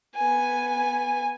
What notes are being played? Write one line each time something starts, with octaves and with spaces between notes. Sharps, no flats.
B3 G#5